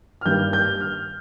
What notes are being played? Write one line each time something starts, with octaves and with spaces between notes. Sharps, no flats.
F6
G2 D#3 G3 A#3 G6
G6
F6